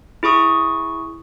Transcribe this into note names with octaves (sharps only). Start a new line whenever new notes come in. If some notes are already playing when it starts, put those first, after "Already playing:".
E4 G#4 C#6 D#6